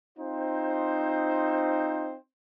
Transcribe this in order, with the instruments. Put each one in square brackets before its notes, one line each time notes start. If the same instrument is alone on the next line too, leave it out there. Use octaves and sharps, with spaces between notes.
[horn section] C4 D#4 F4 C5